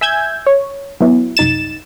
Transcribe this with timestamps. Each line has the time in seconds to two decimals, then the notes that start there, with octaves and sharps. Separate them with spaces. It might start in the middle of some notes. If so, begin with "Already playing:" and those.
0.01 E5 G#5 E6 G6 G#6
0.47 C#5
1.01 F#3 B3 E4
1.37 C2 F#2 D#4 A6 E7